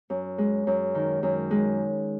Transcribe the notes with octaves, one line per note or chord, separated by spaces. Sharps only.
F#2
G#3
F#2
D#3
F#2
G#3